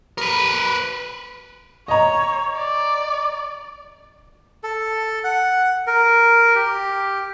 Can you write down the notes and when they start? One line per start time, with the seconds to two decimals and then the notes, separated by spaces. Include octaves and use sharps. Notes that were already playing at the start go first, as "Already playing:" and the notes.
0.18 A#4 B4
1.88 C#5 D#5 A#5
2.57 D5
4.63 A4
5.24 F#5
5.87 A#4
6.55 G4